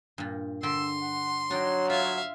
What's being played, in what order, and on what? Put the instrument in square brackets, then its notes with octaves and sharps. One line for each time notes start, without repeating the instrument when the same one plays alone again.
[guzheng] G2 A#2
[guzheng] D3 G5 B5 [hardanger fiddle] C6 [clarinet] E6
[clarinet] F#5
[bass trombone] F#3 [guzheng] D4 D#4 G5 [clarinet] C#5
[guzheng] F4 [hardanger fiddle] E5 F5